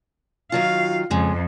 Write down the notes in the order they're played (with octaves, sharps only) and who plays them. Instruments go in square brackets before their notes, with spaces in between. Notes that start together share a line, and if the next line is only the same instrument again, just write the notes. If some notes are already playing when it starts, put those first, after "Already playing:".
[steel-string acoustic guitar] D#3 F#3 F4 [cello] F5
[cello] F2 [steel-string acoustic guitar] C#3 G#3